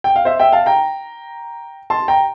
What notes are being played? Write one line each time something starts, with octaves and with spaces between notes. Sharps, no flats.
G5
F5
C5 E5
E5 G5
F5 A5
G5 A#5
A5 C6
G5 A#5